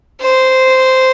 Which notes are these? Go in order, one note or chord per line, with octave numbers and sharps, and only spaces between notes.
C5